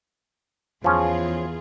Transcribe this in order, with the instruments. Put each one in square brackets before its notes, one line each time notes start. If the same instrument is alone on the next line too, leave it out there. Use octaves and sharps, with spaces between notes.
[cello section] E2 F4 G#4 [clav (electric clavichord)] F3 C#4